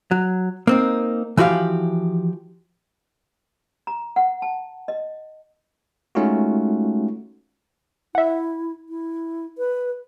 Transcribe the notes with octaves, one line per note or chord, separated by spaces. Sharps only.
F#3
A#3 C4 D#4
E3 F3 F#4 G4 F5
A#5
F#5
A5
D#5
G#3 A3 C#4 D#4 F4 F#4
E4 E5 F#5
E4
B4